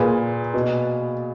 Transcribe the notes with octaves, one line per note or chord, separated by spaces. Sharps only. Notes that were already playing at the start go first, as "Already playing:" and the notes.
Already playing: A#2 G#4 B4
B2